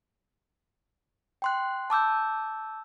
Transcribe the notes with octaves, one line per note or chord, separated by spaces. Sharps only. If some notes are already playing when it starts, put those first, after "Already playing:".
G5 C6 F#6
A5 D6 E6 G6